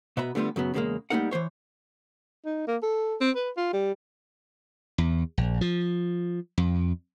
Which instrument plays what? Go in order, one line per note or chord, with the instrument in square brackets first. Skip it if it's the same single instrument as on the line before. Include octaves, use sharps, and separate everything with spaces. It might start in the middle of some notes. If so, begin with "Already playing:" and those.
[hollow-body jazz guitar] B2 B3 E5 A#5 B5
D3 G3 A3 B3 F4
F#2 C#3 F#3 B3
E2 C#3 E3 G3 G#3 A#3
G3 A3 A#3 D#4 A#4 F#5
E3 G3 C5 C#5
[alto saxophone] D#4
A#3
A4
C4
B4
F4
G3
[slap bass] E2
A#1
F3
F2